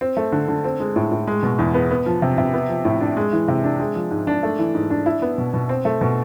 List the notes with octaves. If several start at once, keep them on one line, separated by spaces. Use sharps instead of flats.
C4
A3
D3
D3
C4
G#3
A2
A2
G#3
B2
E2
B3
B3
F3
C3
C3
B3
F3
A2
D4
G#3
E3
C3
D4
G#3
F3
G#2
D4
A3
E3
G#2
D4
E4
B3
B2
B2
C4
A3
B2